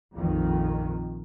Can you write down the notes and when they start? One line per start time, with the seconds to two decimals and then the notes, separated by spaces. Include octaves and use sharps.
0.14 A#1 F2 D#3